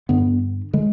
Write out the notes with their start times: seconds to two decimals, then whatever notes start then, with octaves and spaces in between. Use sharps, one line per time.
0.09 G2 D3 B3
0.73 D3 G#3